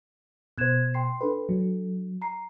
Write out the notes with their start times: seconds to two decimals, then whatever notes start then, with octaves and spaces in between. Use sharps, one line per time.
0.58 B2 C5 F#6 G#6 E7
0.94 G5 C6 C7
1.21 D4 A4 B4
1.49 F#3
2.22 A#5 C7